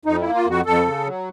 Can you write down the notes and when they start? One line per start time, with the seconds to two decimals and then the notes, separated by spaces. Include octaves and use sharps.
0.05 F2 D#4
0.20 A#3 E4
0.35 F4
0.46 F2 F#4
0.66 F2 A4
0.86 C#3
1.06 F#3